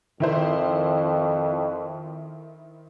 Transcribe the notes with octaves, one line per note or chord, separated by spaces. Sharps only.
F2 D#3 E4 C5